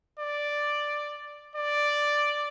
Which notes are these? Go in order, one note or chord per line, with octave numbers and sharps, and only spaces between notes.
D5
D5